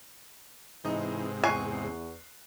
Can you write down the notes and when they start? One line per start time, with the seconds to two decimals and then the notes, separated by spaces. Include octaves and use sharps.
0.85 G#2 C3 E3 D#4
1.44 E2 G#5 C#6 F#6 C7